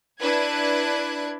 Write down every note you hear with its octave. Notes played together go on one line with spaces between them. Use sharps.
D4 E4 B4 F#6 G#6